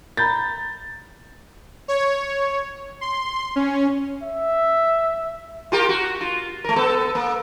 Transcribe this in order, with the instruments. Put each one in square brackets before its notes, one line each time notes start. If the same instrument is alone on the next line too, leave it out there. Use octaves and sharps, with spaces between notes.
[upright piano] A#5 B5 G6 A6
[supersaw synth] C#5
C6
C#4
[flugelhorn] E5
[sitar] F4 G4 A#4
F#4
F4
A3 A#4
B3 A4
A#3